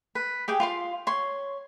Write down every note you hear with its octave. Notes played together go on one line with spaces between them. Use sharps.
B4
G4 G#4 G5
F4 F5 C6
C#5 C6